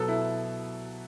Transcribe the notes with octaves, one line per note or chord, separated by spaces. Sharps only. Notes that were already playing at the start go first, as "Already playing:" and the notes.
Already playing: B2 F#3 B3 A4
E4